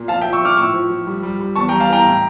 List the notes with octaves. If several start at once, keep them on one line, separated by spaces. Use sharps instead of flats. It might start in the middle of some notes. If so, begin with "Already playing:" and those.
Already playing: A#2
F3 F5 A5
E5 G5
F3
C#6 E6
F3 D6 F6
A2 C#6 E6
F3
F3
G3
G3
G3
E2 A5 C#6
G5 A#5
G3
F5 A5
E3 G5 A#5
A2